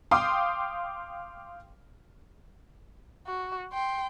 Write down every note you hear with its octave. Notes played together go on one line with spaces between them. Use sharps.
F5 G5 C6 D6 D#6
F#4
G5 C6